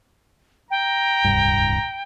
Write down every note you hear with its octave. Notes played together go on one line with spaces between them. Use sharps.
G5 A#5
D1 C2 G2